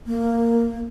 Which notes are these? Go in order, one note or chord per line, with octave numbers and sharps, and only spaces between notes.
A#3